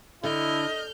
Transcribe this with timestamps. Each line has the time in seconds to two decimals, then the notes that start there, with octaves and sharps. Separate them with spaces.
0.24 D3 E4 D#5 F6 G6